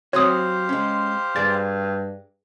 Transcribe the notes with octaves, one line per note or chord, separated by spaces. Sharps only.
F#3 C4 F#4 G4 C5 C#5 F5 D#6
G#3 C#4
G2 G#4 D5 A6